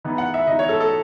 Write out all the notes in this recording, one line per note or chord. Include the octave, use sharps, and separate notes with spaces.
E3 B3 D#4
F#5
E5
E3 B3 D#4 D#5
C#5
A4
A4